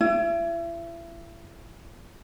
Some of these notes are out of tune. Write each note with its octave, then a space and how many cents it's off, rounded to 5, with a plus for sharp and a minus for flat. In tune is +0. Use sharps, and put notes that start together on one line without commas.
E4 +35